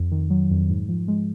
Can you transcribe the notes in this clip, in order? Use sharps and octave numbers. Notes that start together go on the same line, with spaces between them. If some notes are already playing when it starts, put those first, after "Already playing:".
Already playing: F2
D#3
F#3
F2
G#2
F3
G#3